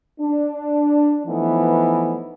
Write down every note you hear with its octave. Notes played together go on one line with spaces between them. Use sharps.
D4
E3 F3 A3 B3 D#4